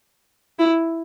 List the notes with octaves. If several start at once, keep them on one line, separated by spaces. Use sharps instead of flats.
E4